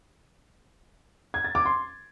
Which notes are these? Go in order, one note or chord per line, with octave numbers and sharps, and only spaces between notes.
G#6
A6
D6
C6